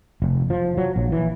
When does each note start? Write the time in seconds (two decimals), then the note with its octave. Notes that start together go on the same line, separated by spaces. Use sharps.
0.22 F1
0.50 F3
0.77 F#3
0.96 A#1
1.12 E3